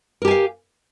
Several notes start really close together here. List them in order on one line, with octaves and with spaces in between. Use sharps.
A#4 G4 G#5 F5